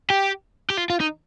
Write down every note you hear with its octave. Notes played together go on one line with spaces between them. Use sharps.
G4
G4
F4
F4
D#4